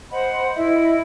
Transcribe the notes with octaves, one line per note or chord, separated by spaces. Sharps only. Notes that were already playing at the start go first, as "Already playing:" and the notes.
C5 D#5 F#5 B5
E4 D#5 E5